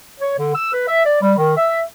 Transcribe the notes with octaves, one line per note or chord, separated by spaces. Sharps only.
C#5
D3
E6
B4
E5
D5
G3
D#3
E5